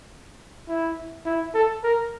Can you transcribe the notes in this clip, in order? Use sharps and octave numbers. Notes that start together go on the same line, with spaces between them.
E4
E4
A4
A#4